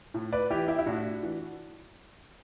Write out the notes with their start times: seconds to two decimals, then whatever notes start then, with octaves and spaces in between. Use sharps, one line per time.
0.14 A2
0.33 B4 D5
0.51 E3 E4 G4
0.68 E4 G4
0.79 E4
0.86 A2 D4 F#4
1.23 E3